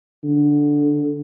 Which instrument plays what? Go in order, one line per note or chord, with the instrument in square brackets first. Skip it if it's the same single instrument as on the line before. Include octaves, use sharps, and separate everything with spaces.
[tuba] D3